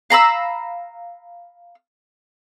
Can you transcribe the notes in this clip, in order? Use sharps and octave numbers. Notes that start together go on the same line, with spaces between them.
F5 A#5 B5 E6